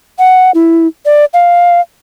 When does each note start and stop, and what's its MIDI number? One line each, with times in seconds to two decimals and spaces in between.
0.19 0.51 78
0.54 0.87 64
1.06 1.25 74
1.34 1.80 77